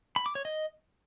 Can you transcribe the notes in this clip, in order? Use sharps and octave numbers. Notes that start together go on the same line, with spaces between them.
B5
D6
C#5
D#5